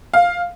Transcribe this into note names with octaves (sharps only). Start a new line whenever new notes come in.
F5